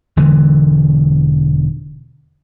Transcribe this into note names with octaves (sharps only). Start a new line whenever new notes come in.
E1 D3 E3 G#3